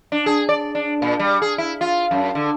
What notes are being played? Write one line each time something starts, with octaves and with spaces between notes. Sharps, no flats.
D4
G#4
D5
D4
A#2
G3
G#4
E4
F4
F#2
D3